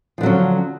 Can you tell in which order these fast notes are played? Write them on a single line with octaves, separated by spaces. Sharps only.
F3 D3 F#3 C#4